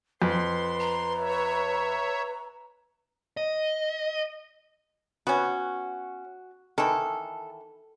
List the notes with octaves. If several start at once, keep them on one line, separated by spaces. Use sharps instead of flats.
F2 B4 C6
A#5
C#5 E5
D#5
B3 C#4 F#4
D#3 E3 A4